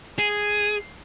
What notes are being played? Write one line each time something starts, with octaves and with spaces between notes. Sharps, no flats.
G#4